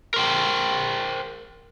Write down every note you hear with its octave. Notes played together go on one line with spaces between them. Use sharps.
A#4 C5 G5